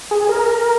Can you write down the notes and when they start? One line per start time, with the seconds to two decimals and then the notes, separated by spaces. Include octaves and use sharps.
0.11 G#4
0.29 A#4